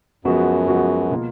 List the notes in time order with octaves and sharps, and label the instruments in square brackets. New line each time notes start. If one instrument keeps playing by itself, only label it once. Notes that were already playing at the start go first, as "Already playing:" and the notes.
[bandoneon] F#2 [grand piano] F3 G#3 B3 F#4
[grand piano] F3 G#3 B3 F#4
B2 A#3 F4